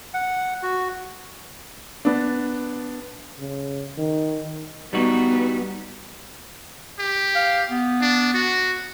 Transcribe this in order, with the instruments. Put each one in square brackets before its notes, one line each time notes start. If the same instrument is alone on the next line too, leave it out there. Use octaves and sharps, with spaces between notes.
[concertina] F#5
F#4
[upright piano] B3 D4
[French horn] C#3
D#3
[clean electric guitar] G3 D#4 F#4 [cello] B3
[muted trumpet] G4
[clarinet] F5
B3
[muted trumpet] D4
F#4